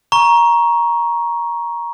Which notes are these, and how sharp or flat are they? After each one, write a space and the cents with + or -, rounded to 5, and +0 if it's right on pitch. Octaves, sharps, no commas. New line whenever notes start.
A#5 +15 C#6 +0